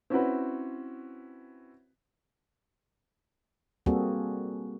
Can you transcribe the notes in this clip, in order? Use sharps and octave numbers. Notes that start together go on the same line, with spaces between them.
C4 C#4 E4 F#4 B4
G3 A#3 C4 F#4 G#4 A4